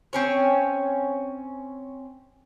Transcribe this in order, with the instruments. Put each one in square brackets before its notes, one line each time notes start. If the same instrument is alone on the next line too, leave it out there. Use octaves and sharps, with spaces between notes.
[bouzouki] C4 C#4 C#5